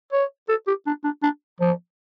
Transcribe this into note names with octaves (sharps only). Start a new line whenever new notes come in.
C#5
A4
G4
D4
D4
D4
F3